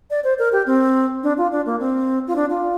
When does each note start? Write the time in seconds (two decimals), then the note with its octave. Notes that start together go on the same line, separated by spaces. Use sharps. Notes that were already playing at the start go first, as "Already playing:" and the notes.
0.10 D5
0.24 C5
0.39 A#4
0.53 G4
0.66 C4
1.23 D4
1.38 F4
1.52 D4
1.66 A#3
1.80 C4
2.27 F4
2.36 D4
2.50 F4